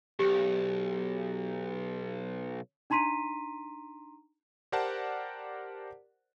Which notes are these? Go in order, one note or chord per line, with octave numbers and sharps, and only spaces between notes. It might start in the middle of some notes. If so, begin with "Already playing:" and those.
B1 G4
D4 D#4 A#5 C6 B6 D#7
G4 A#4 C5 D5 F#5 A5